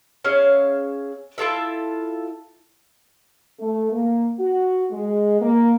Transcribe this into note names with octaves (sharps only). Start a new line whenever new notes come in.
C#4 G#4 E5 F5
E4 F4 A4 E5
A3
A#3
F#4
G#3
A#3